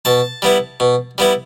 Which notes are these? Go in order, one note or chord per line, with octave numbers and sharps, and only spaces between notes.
B2 A5
G3 B3 E4
B2
G3 B3 E4